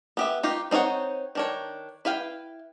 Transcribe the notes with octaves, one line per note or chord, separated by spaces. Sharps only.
B3 G4 E5
D#4 F4 G4
C4 D#4 A4 C#5 F#5
D#3 D4 C#5
E4 B4 F5 G5